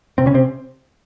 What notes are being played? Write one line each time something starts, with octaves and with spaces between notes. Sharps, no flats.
C3 C4
C#3 C#4
C3 C4